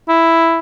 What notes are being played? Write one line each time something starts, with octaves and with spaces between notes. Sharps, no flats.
E4